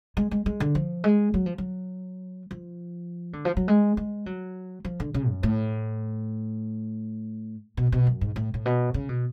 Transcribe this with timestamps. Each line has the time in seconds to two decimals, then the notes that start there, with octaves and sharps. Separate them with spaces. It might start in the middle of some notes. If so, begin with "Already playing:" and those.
0.17 G#3
0.31 G#3
0.46 G#3
0.60 D3
0.75 F3
1.04 G#3
1.34 F#3
1.46 F3
1.58 F#3
2.51 F3
3.33 D3
3.45 F3
3.57 F#3
3.68 G#3
3.97 G#3
4.26 F#3
4.85 F3
5.00 D3
5.14 C#3
5.29 F#2
5.43 A2
7.77 B2
7.92 B2
8.07 F#2
8.21 G#2
8.36 A2
8.54 A2
8.65 B2
8.94 C#3
9.09 B2